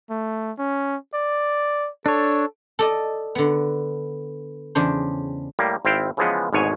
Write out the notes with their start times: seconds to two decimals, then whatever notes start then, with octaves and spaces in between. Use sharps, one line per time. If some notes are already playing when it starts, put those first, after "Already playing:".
0.10 A3
0.58 C#4
1.14 D5
2.06 D4 A4 C#5
2.79 A4 D5 D#5
3.35 D3 B3
4.75 E2 C#3 D4 C5
5.59 A2 G3 A#3
5.85 G#1 C4 E4 F5 G5
6.17 C#3 E3 F3 G#3 B3
6.53 G#1 D2 G#2 B2 C#5 G#5